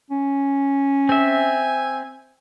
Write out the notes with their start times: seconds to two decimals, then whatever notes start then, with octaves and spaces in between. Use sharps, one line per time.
0.11 C#4
1.09 C4 E5 G#5